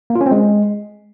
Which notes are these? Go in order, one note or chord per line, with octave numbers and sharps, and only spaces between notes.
A#3
F4
C#4
C4
G#3